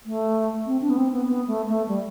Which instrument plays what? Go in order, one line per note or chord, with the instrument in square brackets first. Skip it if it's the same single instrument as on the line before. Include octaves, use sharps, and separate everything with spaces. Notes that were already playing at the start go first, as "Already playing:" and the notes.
[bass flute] A3
C4
D4
B3
C4
B3
B3
A3
A3
G3